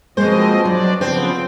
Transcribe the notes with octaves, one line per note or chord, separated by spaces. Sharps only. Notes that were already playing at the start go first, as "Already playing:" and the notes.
B2 F3 G#3 A#3 C4 C5 D#5
F#3 D4 D5
C#3 F3 B3 C4 C5